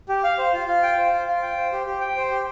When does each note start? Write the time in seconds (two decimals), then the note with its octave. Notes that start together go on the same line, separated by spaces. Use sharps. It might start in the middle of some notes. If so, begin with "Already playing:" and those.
0.09 G4
0.24 F5
0.38 C5
0.53 F4
0.68 F4
0.83 G5
0.98 C5
1.13 F4
1.28 F4
1.42 G5
1.57 C5
1.72 G4
1.86 G4
2.01 G5
2.17 C5
2.31 G4